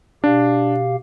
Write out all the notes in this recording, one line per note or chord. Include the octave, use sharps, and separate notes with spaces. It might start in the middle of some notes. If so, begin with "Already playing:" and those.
B2 D4 G4 F5